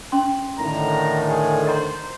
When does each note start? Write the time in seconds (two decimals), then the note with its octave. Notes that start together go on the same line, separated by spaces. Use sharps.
0.12 C#4 C6
0.59 A2 D3 D#3 A#5
1.26 G#4
1.67 C5 D#5 A#5 C6